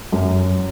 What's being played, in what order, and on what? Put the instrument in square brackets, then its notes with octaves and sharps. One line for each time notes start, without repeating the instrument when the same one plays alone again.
[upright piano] F#2